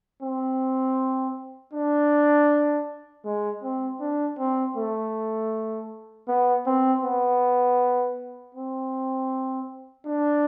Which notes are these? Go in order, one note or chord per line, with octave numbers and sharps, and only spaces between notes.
C4
D4
G#3
C4
D4
C4
A3
B3
C4
B3
C4
D4